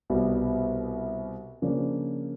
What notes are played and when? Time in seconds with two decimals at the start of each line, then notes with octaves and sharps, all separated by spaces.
0.10 C2 B2 G3 B3
1.62 C#3 F3 A#3 D4